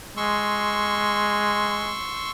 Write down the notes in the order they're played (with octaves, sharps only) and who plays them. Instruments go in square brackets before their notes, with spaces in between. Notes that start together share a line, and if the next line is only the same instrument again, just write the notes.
[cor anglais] G#3 [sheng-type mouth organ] C6 C#6 E6